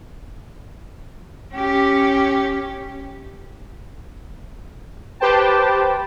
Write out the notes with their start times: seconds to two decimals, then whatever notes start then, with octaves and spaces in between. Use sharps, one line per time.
1.53 C#4 G4
5.20 G4 B4 C5 G5 A5